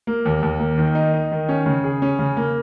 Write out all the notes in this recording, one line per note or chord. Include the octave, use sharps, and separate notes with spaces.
A#3
D#2
D#2
A#3
D#3
D#4
D#4
D#3
C#4
C#3
G#4
C#4
C#3
A#3